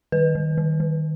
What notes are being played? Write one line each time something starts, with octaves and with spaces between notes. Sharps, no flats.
D#3 B4
D#3
D#3
D#3